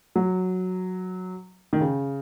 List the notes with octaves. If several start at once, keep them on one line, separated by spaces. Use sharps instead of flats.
F#3
D#3
C#3